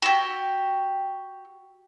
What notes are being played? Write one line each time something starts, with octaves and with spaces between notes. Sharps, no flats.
F#4 G4